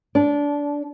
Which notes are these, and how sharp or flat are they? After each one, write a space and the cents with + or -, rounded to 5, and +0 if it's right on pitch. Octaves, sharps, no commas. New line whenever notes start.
D4 -20